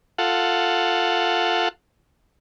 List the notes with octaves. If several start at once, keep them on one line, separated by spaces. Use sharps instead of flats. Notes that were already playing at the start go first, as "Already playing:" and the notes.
F4 A4 F#5